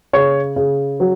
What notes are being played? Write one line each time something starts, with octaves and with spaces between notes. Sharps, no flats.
C#3 C#5
C#3
F#3